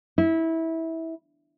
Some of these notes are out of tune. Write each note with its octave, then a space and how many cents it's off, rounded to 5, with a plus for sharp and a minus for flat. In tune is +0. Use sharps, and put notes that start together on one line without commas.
E4 -20